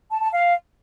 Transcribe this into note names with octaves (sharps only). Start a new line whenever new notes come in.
A5
A5
F5